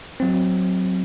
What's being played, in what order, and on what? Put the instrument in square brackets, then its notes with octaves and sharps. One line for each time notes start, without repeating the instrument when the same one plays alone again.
[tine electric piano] F#3 C4